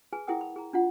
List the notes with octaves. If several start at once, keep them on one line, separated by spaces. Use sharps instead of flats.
G#4 B4 G#5
E4 G#4 A#4 F#5 G5 D#6
B5
G#4 A#5
D4 F4 F#5